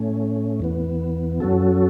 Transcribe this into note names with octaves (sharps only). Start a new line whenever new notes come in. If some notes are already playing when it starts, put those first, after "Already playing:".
Already playing: A2 A3 C#4
E2 E3 B3
F#2 F#3 C#4 F#4 A4